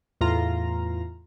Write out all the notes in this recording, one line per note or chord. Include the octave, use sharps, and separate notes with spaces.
E2 A2 F4 A#5